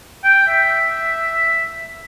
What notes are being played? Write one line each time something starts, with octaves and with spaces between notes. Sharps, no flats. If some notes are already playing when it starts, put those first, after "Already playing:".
G5
E5